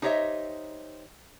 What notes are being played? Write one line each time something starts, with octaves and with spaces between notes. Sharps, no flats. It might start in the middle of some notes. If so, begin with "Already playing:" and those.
D#4 G4 C5 C#5 D#5 E5